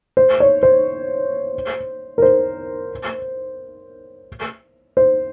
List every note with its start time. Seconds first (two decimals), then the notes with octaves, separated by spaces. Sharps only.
0.17 C5
0.40 C#5
0.63 C5
2.18 A#4
2.22 C5
4.97 C5